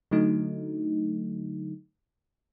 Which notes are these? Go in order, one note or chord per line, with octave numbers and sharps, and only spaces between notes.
D3 F#3 A3 D#4